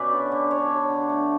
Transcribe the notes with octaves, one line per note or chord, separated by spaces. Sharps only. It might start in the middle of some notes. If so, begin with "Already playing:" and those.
Already playing: B2 C#4 G4 B4 D5 E5
D3
D3
D4 C#5
D3
D3
A3